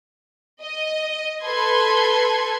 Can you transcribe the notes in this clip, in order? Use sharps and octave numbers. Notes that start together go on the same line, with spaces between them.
D#5
A4 B4 C6 G#6